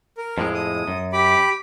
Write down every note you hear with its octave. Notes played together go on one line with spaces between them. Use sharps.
A#4
F2 A2 G#3
D#6
F#2
G4 B5 D6